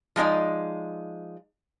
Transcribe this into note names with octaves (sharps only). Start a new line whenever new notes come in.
F3 G#3 D#4 D5